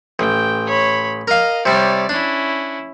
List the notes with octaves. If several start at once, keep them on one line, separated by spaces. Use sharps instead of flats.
A1 G5
C#5 B5
A#4 D#5 F5
C3 G3 C#5 D5
C#4 D4 E4